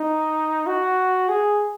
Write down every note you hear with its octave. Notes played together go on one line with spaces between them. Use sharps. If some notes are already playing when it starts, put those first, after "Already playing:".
Already playing: D#4
F#4
G#4